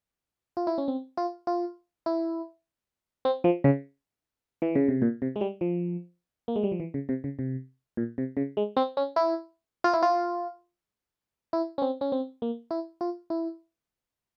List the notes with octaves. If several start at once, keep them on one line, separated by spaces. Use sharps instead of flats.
F4
E4
C#4
C4
F4
F4
E4
C4
F3
C#3
E3
C#3
C3
A#2
C3
G#3
G3
F3
A#3
G#3
G3
F3
E3
C#3
C3
C#3
C3
A#2
C3
C#3
G#3
C4
C#4
E4
F4
E4
F4
E4
C#4
C4
C#4
C4
A#3
E4
F4
E4